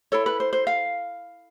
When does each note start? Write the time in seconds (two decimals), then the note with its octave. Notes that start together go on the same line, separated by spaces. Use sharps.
0.12 E4 A4 C#5
0.26 B4
0.40 C5
0.53 C5
0.67 F5